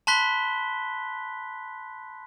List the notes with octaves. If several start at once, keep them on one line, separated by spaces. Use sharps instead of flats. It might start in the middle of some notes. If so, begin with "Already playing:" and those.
A5 B5 C6 F#6 B6 G7